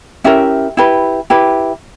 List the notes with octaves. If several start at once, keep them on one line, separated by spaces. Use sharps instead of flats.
C#4 E4 G4 A#4 E5
E4 G4 B4
E4 G4 B4